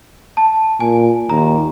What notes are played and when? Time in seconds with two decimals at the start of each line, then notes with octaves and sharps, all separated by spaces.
0.37 A5
0.80 A#2 G#5
1.29 D#2 A#5